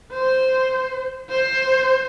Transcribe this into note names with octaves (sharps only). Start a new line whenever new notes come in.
C5
C5